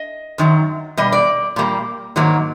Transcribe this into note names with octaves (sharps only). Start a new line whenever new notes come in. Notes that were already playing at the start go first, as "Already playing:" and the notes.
Already playing: D#5
F#2 D#3 F#3
B2 G3 D#5
D5
A#2 G3 A#3
G#2 D#3 F#3 A#3